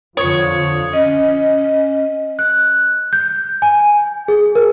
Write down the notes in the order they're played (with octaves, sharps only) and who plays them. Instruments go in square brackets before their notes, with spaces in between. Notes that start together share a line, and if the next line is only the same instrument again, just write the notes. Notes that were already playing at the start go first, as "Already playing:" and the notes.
[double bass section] F2 D3 [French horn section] F4 [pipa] C#5 [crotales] D#6 G#6 C#7
[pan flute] C#4 [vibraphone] D#5
[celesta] F#6
G6
G#5
G#4
A#4